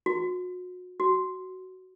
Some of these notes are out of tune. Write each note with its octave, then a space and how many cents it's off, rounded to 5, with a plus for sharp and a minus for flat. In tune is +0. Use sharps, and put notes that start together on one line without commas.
F#4 -35
F#4 +10